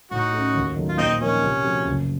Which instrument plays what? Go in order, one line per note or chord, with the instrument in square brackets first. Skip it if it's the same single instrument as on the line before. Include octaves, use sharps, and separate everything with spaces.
[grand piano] A2 [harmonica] D#4 F#4
[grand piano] A3 C#4
D#2
D#3 F#3 A3
[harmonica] F4
[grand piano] A#2 [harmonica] C4 D#4
[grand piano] F3 C4 D#4 A#4 [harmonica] C#4
[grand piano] C3
F3 A3 C4 F#4
F#1